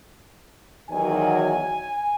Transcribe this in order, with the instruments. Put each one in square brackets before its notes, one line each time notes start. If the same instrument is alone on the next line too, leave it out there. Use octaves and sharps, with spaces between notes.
[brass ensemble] E2 D#3 F#3 G#5